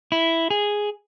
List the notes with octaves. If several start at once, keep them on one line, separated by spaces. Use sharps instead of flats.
E4
G#4